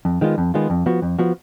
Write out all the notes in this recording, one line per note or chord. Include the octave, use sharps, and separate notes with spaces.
F2
D#3 G#3 B3 F4
F2
D#3 G#3 B3 F4
F2
F3 B3 F#4
F2
F3 B3 F#4